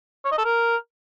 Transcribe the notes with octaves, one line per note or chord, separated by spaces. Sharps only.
C#5
D#5
A4
A#4